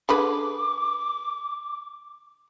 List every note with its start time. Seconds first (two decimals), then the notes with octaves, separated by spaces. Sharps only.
0.09 D3 G#4 B4 D6